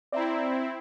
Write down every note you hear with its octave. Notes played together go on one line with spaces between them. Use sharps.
C4 E4 D5 E5 A#5